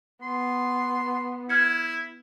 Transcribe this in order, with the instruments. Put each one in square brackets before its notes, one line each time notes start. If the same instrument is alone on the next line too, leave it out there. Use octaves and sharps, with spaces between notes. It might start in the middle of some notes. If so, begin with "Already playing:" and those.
[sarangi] B3 [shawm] C6
[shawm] E4 [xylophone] F6 G#6 C#7